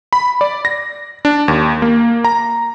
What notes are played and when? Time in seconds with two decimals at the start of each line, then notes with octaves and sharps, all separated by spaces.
0.13 B5
0.41 D5
0.65 A#6
1.25 D4
1.48 D#2
1.82 A#3
2.24 A#5